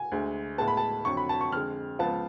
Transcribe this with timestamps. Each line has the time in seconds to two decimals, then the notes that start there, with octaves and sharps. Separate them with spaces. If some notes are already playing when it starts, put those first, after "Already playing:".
Already playing: G#5
0.12 D2 D3 G#3
0.58 A2 G#3 B3 A5
0.68 B5
0.77 A5
1.05 F2 D3 F#3 C#6
1.17 B5
1.29 A5
1.41 C#6
1.52 F2 D3 G#3 F6
1.99 C#2 C#3 F3 B3 F4 A5